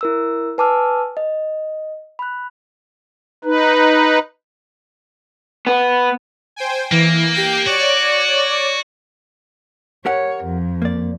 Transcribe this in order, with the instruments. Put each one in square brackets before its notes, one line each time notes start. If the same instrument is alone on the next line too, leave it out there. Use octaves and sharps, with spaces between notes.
[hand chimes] E4 A#4 E6
B4 G#5 A5 D6 E6 F6
D#5
B5 F#6
[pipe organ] D#4 B4
[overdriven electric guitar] B3
[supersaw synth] C5 G5 G#5
[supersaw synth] E3 [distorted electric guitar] A#3
[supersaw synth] G4 G5 G6
[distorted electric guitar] F#4 [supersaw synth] C#5 D5 D6
[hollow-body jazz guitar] G4 A#4 F#5 [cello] C#5
[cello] F2
[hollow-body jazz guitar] A#3 D5